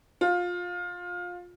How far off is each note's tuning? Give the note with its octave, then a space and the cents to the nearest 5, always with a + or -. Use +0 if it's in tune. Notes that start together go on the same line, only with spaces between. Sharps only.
F4 +20